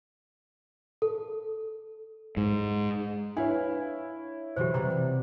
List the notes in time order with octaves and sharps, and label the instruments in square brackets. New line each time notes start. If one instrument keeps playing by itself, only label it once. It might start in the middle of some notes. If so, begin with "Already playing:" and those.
[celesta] A4
[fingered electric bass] G#2
[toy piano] D4 [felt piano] E4 C#5 [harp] B4 F5
[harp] B2 E3 F#3 [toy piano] G4 C5
[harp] C3 F#3 G3 [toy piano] A#5